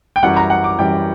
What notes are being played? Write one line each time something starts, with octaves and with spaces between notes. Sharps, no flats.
G5
F#2 E3 G3 F#5
A#5
F#5
D6
F#2 E3 G3 G5